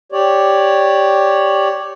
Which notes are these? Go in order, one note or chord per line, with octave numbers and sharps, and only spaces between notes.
G4 C#5 D5